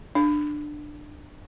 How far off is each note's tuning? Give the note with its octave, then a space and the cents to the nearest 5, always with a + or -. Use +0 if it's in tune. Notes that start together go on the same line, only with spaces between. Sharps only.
D4 +20